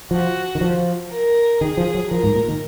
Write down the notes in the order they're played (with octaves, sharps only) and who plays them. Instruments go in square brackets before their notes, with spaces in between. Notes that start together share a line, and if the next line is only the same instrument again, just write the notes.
[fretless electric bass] F3 [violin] F#4
[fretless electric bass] D#3
F3
[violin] A#4
[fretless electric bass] D#3 [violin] G#4
[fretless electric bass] F3
F#3
[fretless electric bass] F3 [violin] A#4
[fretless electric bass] G#2
A#2
D#3